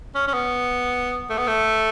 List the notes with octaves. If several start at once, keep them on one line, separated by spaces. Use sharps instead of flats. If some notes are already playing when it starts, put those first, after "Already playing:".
C#4
C#4
B3
A3
B3
A3